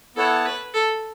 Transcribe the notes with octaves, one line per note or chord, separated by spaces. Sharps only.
B3 E4 A4 C#5 F#5 A5
B4
A4